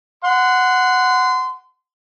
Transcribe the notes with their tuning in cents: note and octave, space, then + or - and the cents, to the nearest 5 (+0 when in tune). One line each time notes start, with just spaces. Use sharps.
F#5 +0 C6 -25